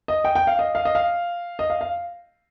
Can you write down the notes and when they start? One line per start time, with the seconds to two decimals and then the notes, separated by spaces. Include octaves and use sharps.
0.08 D#5
0.25 G5
0.35 G5
0.47 F5
0.59 D#5
0.75 F5
0.85 D#5
0.95 F5
1.59 D#5
1.70 F5
1.81 F5